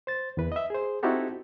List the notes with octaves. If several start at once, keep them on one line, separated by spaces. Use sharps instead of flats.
C5 A6
E2 E3 B4
D#5 E5
G#4 C5
C4 D#4 E4 F#4 G4 A4